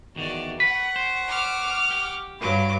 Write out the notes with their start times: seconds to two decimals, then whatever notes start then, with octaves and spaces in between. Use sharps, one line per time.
0.16 E2 D#3 F#4 D5
0.60 B4 F#5 C#6 B6
0.96 C5
1.28 D6 F6
1.91 G4
2.40 G2 F#3 B5 D6